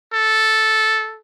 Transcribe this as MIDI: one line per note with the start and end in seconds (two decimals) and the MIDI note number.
0.13 1.18 69